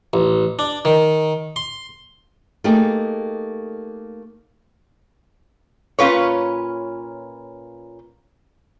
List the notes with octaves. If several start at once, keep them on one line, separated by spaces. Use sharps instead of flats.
A1
D4
D#3
C6
A3 A#3 D#4 G4 G#4
A#2 C#4 F4 B4 C#5